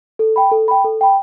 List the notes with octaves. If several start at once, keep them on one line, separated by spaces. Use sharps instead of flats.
A4
G5 B5
A4
G5 B5
A4
G5 B5